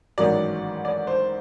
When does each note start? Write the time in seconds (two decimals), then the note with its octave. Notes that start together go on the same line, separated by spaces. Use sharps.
0.18 A1 G#2 D#3 F#3 D5
0.85 D5
1.07 C5